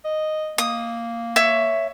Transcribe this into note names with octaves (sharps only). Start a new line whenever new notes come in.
D#5
A#3 D#6
C#5 E5